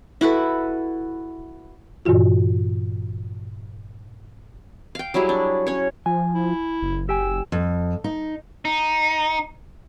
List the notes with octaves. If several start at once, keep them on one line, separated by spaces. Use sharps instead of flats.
E4 F#4 A4 B4
G2 A#2 E3 F4 F#4
F5 G5
F#3 G3 E4 G#4
D4
C#4 C#5
F3 G#5
E4
F#1
G4 G5 G#5 E6
F2
D#4
D#4